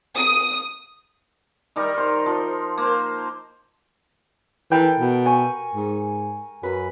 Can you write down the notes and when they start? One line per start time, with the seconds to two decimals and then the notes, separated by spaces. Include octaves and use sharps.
0.18 D#6
1.76 D#3 G3 D#4 A#4
1.98 C5
2.26 F3
2.78 A#3 C5
4.72 E3 A4 A#4 G5
4.99 B2
5.26 G#5 C#6
5.75 G#2
6.63 F#2 B4